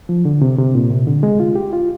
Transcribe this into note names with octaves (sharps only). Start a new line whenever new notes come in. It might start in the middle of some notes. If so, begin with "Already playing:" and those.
F3
D3
C3
C3
A#2
C3
D3
G#3
F4
G4
F4